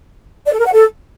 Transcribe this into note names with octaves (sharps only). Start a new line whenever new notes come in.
D5
A4
A#4
F#5
A4